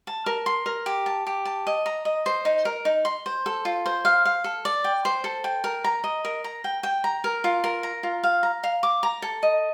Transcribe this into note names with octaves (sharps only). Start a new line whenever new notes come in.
A5
A#4
C6
A#4
G4
A5
G4
A5
D#5
A#5
D#5
C5
D#4
A#4
D#4
C6
C5
A4
F4
C5
F5
F5
A4
D5
G5
C5
A4
G5
A#4
A#5
D#5
A#4
A#5
G5
G5
A#5
A#4
F4
A#4
A#5
F4
F5
A#5
F5
D6
A#5
A4
D#5